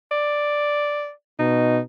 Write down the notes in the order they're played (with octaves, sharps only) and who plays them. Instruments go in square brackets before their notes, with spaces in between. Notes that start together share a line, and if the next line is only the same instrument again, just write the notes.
[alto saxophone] D5
[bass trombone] B2 [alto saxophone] D#4